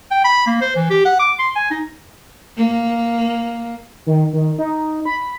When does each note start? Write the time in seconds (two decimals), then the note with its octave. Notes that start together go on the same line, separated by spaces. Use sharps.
0.11 G5
0.24 B5
0.47 A#3
0.61 C5
0.76 E3
0.90 G4
1.05 F#5
1.20 D6
1.39 C6
1.56 G#5
1.71 D#4
2.57 A#3
4.07 D#3
4.33 D#3
4.58 D#4
5.05 B5